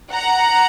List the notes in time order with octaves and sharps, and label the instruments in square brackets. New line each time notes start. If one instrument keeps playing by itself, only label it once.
[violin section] F#5 A#5